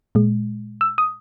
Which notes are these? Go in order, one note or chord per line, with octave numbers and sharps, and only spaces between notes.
A#2 G#3
E6
D#6